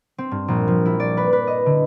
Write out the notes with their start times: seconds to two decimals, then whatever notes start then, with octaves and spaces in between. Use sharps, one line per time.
0.18 C4
0.31 G2
0.48 A#1
0.68 F3
0.86 E4
1.00 D5
1.17 B4
1.33 B4
1.47 D#5
1.66 D3